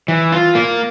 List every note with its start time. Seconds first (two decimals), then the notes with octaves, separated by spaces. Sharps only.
0.08 E3
0.32 F4
0.55 A#3